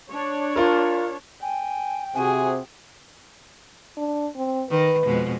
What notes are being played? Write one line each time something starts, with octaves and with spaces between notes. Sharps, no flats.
D4 C#5
F4 A#4
G5 G#5
C3 F#4 G#4 G#5
D4
C4
D#3 B4
F2 B2 G#3